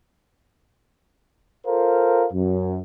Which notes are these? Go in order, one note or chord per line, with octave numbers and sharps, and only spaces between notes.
F4 A4 A#4 C5 F5
F#2